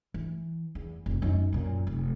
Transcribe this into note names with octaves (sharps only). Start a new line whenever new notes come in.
E3
E2
F1
F#2 D#4
F#2 A#2
F1